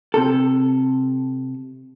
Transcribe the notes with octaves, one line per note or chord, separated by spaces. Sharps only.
C3 A4